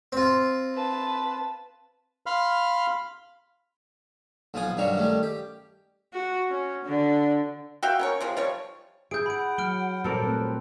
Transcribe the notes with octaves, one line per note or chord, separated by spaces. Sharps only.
C4 F4
B4 A5
F5 B5 C6 F6
B1 F3 B3 F4 G#5 D#6
G2 D#3 F#3 G3 F5 C#6
D#3 G3 A3 C#4
G4
F#4
C#4
D3
F#4 E5 F5 G5
C#4 A#4 C#5
C3 F3 G#3
F3 G3 C#5
E4 G#4 G6 D7
F#5 B5 D7
F#3 F6 D7 G7
A#2 G3 A4 A#4 C5 D5
A3 C4 B4